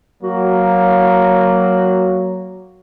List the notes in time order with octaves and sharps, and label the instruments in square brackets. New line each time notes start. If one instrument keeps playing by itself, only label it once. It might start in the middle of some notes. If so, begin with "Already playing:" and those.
[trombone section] F#3 [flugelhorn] A#3 [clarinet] F#4